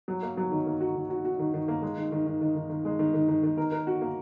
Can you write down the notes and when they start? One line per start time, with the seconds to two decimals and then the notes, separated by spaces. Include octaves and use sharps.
0.08 F#3
0.22 A#3
0.37 F#3
0.52 D#3
0.66 A#3
0.81 F#4
0.95 D#3
1.10 F#4
1.25 F#4
1.39 D#3
1.54 D#3
1.68 A#3
1.82 G#3
1.98 D#3
2.12 D#3
2.26 D#3
2.41 D#3
2.55 D#3
2.70 D#3
2.85 G#3
2.99 D#3
3.14 D#3
3.28 D#3
3.43 D#3
3.58 A#4
3.72 A#4
3.87 F#4
4.01 A#3